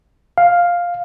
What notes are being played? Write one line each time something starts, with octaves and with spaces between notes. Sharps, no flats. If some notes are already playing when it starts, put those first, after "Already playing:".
F5